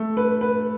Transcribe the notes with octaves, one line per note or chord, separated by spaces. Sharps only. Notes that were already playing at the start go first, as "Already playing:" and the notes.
Already playing: A3
B4
B4